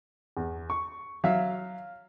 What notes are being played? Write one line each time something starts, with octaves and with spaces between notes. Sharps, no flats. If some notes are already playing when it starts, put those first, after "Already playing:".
E2
C#6
F#3 E5 F5